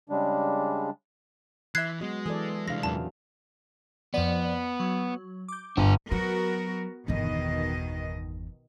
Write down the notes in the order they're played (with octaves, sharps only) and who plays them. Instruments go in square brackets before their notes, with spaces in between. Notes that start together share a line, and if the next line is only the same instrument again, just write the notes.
[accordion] C#3 G3 G#3 D4
[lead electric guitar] E3 [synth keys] E5 C6 E6 [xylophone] F#6 G#6 C7
[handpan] F#3 B3 F#4 [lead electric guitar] G#3 [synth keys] D#5
[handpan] E3 A4 D5 [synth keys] G#4
[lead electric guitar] C2 G#3 [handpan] E3 D4 F5 [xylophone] A#6
[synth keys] E2 A#2 [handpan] F#3 C#4 [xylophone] A5
[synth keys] F2 F3 D5 [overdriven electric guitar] B3
[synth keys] F#3
D6 G6
[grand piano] G1 [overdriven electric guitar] D4 G#5
[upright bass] F#3 [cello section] B3 F#4 A#4
[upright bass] G1 E2 [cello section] B2 D#3 D#5